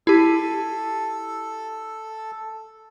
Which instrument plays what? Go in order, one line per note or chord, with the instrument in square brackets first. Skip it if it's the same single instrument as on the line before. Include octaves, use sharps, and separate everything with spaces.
[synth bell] E4 G4 [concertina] A4